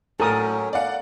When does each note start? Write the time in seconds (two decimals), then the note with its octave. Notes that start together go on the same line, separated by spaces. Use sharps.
0.20 A2 F#3 C#4 A4 A#4 D#6
0.73 D5 F5 F#5